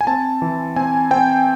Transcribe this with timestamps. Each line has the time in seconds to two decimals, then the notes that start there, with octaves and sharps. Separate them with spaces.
0.01 G#5
0.07 C4 A5
0.42 E3
0.76 C4 G#5
1.11 C4 G5